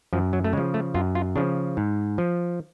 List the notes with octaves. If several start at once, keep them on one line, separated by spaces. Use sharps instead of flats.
F#2 F3
F#3
A3
C#3 F3 G#3
A3
F#2 F4
F4
C#3 F3 D4
G#2
F3